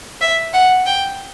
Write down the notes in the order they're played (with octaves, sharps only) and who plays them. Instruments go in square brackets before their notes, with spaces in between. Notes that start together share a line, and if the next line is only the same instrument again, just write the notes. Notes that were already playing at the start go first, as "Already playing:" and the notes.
[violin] E5
F#5
G5